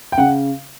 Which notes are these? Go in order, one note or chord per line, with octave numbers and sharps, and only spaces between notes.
G5
C#3 F#5